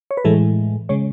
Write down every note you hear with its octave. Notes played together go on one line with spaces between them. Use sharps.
C#5
B4
A2 E3 G#3 A4
C#3 G#3 C#5